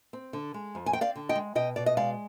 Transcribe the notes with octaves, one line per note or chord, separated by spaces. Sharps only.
C4
D3
G#3
F2
G#5
C4 G5
D5 F5
D3
D#5 G5
G#3
B2 D#5 G5
B2 D5
D#5
G#3 D5 F5